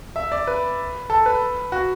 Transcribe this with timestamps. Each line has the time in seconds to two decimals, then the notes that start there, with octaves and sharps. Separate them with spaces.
0.16 E5
0.32 D5
0.47 B4
1.10 A4
1.26 B4
1.72 F#4